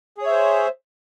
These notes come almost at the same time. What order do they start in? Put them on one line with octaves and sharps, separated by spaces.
G#4 C#5 E5 C5